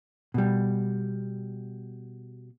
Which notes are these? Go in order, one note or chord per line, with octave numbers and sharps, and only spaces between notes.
B2 G3